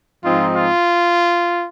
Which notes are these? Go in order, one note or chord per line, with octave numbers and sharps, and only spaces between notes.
G#2 F3 C4 D#4 F4
F4